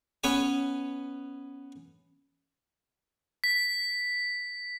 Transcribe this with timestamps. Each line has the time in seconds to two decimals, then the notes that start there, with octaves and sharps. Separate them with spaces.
0.24 B3 C#4 B4 C#5 G#5
3.44 B6